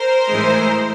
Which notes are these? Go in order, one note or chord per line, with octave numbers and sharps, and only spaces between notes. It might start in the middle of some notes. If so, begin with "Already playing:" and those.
Already playing: A#4 C5
A2 E3 G#3